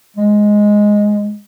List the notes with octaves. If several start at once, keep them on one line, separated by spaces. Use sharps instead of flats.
G#3